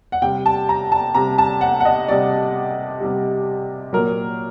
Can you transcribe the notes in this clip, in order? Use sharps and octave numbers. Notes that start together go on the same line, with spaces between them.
F#5
C3 G3 G5
A5
A#5
A5
C3 G3 A#5
A5
F#5
F#5
D#5
C3 G3 D5
C3 G3
A#2 F#3 A#4